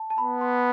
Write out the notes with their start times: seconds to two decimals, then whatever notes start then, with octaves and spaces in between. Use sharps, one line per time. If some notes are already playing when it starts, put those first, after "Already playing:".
Already playing: A5
0.10 A5
0.18 B3 B5
0.41 C6